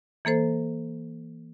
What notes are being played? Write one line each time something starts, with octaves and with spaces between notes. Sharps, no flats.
E3 A#3 A4 C5